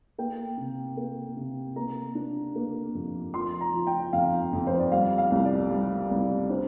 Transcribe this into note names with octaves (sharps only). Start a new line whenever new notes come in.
A#3 G5
C3
A#3
C3
A#3 A#5
D4
A#3
F2
F3 C6
A#5
F3
G5
F2 F5
F2
C5
D5
G3 F5
F5
C2
D5
G3
C2
D4 C5